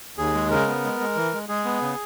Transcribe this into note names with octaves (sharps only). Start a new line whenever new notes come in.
D#2 G#4
G#3
C#3 A#4
B3
G#3
G#3
E3
G#3
G#3 G#4
B3
C#3